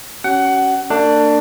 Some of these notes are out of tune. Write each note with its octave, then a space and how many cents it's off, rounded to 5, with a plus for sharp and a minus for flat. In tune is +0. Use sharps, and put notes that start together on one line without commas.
C#4 +10 F#4 +45 F#5 +20
A#3 -45 D4 +10